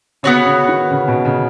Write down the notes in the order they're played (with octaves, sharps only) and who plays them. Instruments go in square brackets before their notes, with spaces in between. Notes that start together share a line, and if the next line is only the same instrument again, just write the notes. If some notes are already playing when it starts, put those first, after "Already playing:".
[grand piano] C#3 [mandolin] B3 F#4 C#5
[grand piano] C#3
D#3
C#3
B2
C#3